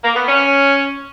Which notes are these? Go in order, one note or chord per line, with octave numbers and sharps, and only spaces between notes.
A#3
B3
C#4